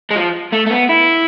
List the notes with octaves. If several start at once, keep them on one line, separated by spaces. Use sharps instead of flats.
G#3
F3
A3
A3
B3
E4